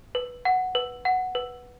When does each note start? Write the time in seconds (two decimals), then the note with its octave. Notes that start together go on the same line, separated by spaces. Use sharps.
0.15 B4
0.45 F#5
0.75 B4
1.05 F#5
1.35 B4